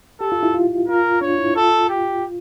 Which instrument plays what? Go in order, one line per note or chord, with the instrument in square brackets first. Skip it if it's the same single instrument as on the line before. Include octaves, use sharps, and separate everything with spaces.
[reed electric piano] G4 [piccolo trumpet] A4
[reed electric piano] F4
E4
F4
[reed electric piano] F4 [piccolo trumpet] A#4
[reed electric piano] D4 [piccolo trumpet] C#5
[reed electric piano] E4
[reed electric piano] F4 [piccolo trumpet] A4
[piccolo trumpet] G4